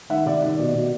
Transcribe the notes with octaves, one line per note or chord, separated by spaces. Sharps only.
D#3 E5 F#5
C3 D5 E5
D#3 D5
B2
B2